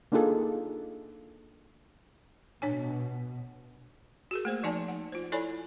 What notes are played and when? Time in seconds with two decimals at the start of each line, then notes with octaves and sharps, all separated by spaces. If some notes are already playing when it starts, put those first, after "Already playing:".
0.12 A#3 D4 D#4 F4 G#4 A4
2.62 B2 D4 C#5 G#5
4.31 F#4 G#4 A#4
4.45 A3 A#3 C5
4.63 F3 D#4 D5 G#5 A5
4.88 F#5
5.12 F4 C5
5.32 E4 A4 C#5 D5 G#5 B5